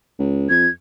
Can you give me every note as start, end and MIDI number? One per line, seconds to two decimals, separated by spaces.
0.19 0.48 37
0.50 0.67 41
0.50 0.69 92